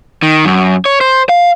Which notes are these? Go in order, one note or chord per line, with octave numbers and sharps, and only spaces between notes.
D#3
F#2
C#5
C5
F5